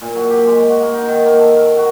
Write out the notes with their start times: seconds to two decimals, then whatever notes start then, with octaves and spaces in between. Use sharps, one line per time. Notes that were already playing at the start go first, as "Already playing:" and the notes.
0.01 A#2
0.15 F#3
0.30 G4
0.47 G#3
0.69 F#4
0.81 A#3
0.93 D#4
1.09 D#3
1.26 A#3
1.39 A4
1.56 A#4
1.76 F#4